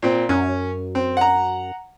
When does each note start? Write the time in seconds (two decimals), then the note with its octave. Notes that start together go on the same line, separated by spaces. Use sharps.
0.02 A#2 C4
0.29 F#2 C#4
0.95 C4
1.17 F#5 A#5